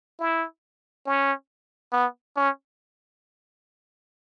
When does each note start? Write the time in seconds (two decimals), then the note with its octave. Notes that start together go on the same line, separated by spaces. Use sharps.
0.19 E4
1.06 C#4
1.92 B3
2.36 C#4